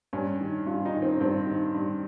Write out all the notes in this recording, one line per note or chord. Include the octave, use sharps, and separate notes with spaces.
G2 C#4
D#3
G2 F4
D#4
D#3
C4
G2 C4
D#3
G2